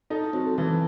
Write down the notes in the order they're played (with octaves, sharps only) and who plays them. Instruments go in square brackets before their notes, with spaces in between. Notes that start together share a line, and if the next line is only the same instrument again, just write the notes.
[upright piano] D#4 [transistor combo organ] A4
[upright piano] F#3 [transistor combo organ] C4
[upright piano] E3 [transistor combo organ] A4